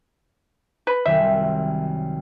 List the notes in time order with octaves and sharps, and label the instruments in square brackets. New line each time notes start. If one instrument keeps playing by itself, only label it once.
[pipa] B4
[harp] C2 F#2 D#3 [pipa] E5